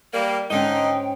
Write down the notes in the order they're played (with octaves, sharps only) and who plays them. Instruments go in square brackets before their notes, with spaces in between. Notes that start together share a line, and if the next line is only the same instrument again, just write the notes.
[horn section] G3 A#3 [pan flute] D5
[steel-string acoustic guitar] G#2 C#4 [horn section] D3 G#3 D#4 [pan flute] G5